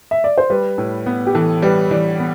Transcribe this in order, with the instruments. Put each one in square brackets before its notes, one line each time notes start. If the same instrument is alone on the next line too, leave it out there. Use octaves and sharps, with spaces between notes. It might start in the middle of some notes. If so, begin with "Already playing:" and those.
[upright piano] E5
D5
C5
[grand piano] G3 [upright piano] B4
[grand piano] A2
B3
[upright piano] G4
[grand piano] E3 [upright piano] A4
[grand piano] G3 [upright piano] B4
[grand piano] E3 [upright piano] D5
[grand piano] B3